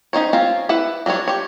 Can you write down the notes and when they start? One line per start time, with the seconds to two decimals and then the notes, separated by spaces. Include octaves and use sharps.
0.13 C#4 D#4 C5 C#5
0.33 C4 C#4 F4
0.69 E4 B4 F#5
1.06 F#3 G3 D4 C#5
1.28 G4 C#5